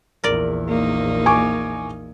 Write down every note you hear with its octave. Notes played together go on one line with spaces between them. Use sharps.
A#1 E2 A#4 D5
A#3 D#4
G#5 C#6 D6